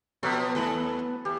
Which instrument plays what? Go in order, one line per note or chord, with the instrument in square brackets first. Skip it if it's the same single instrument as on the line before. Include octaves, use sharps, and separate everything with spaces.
[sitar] B2 F3 [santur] F#3 A4 [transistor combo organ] B3 [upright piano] C#6 F#6 B6
[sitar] D#2 A4 [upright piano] A3 E4 F#7 [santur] B4
[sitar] E2 [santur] G4